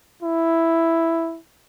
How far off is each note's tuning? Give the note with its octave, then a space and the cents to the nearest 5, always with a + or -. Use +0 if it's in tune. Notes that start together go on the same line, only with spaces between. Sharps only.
E4 +0